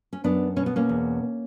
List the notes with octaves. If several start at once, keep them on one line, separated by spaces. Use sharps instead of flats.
C#4
F#2 B3 D4
B2 C#4
B3
A#3 C#4
E2